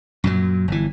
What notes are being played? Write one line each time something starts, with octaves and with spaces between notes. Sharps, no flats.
F#2 A#2 F#3
G1 E3